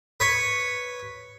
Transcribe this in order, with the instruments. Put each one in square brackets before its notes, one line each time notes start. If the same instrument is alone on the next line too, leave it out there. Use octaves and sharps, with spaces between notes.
[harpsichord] B4 C#5